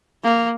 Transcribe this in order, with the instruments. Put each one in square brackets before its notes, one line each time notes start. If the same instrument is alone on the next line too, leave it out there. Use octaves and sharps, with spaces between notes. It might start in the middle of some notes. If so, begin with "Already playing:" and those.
[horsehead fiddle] A#3